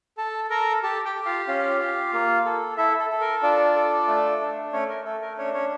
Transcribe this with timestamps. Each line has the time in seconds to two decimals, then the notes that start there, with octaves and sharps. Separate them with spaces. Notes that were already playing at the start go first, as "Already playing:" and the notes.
0.18 A4 A5
0.50 A4 A#4 A#5
0.83 G4 A4 A5
1.05 G4 G5
1.15 G4
1.26 F4 F5
1.47 C#4 F4 F5
1.80 G4
2.13 A#3
2.45 A4
2.77 E4 A4 E5
2.99 A4
3.10 A4
3.20 A#4
3.42 D4 F4 D5
3.76 A4
4.08 A3
4.41 D4
4.73 A3 C#4 C#5
4.89 A#4
5.05 A3 A4
5.22 A#4
5.38 C#4 D4 C#5
5.54 C#4 C#5